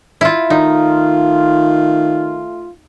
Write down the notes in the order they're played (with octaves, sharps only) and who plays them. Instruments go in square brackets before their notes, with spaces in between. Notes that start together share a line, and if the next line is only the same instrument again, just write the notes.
[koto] E4 F4
[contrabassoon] D#3 [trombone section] A3 F4 [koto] D#4